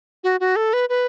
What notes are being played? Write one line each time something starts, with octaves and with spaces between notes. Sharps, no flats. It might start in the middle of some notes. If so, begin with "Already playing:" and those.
F#4
F#4
A4
B4
B4